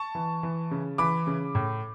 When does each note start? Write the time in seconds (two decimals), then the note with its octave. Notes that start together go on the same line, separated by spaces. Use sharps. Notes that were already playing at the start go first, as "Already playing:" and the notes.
Already playing: A5 C#6
0.15 E3
0.43 E3
0.71 C#3
0.98 E3 B5 D6
1.27 C#3
1.55 A2